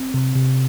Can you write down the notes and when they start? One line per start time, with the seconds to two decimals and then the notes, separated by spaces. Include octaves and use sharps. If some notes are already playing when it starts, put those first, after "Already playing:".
Already playing: C4
0.14 C3
0.35 C3